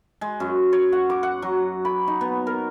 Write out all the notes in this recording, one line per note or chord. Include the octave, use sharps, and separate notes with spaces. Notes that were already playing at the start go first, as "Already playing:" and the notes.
G#3
F#2
C#5
F#5
D6
F#5
F#3
B5
D#4
B3
A#4